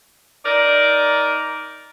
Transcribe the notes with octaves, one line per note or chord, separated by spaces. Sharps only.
D#4 A#4 D5